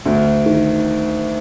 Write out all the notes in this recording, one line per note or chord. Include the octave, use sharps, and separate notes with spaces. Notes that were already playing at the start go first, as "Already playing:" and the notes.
D2
D#3